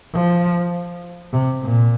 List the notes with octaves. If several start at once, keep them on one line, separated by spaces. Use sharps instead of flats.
F3
C3
A#2